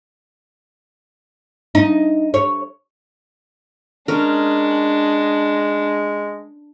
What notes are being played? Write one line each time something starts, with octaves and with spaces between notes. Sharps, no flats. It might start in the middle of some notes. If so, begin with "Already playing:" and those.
D#4
C#5
G#3 C#4 D4 A#4